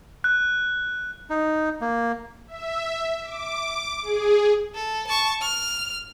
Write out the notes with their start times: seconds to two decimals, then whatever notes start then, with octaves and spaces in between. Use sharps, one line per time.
0.24 F#6
1.30 D#4
1.81 A#3
2.47 E5
3.24 D6
4.03 G#4
4.75 A4
5.07 A5 C#6
5.41 F6